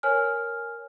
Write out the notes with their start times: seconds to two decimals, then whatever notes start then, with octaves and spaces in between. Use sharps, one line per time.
0.03 A#4 C#5 G#5 F6